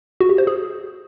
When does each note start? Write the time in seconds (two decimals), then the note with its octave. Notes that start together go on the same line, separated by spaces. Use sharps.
0.20 F#4
0.29 G4
0.38 C5
0.47 G#4